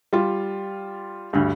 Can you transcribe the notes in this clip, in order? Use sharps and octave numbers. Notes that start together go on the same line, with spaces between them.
G3 F4
D2 G2